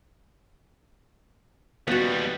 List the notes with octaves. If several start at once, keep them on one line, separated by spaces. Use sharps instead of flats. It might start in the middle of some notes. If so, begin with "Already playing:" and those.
D#2 G3 B3 F#4